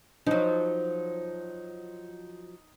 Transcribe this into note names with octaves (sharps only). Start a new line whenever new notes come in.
F3 F#3 D#4